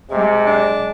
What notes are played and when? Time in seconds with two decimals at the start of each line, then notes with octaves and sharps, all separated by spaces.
0.11 C3 F#3 G#3
0.47 D4